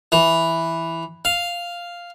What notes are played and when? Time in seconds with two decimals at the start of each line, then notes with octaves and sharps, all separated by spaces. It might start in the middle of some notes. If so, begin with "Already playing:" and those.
0.12 E3
1.25 F5